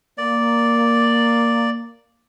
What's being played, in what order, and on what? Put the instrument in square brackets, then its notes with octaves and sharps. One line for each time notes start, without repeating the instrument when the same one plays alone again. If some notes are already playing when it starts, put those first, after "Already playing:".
[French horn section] A#3 [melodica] D5